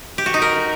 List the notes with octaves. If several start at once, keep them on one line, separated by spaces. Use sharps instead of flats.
G4
F#4
D#4
A#4